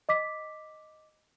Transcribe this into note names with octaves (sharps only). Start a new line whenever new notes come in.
D#5 D6 B6